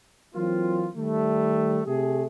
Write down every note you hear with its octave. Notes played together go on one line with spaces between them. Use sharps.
E3 F#3 A#3 C4 F4
D#3 G3 A3
C3 A3 G4 G#4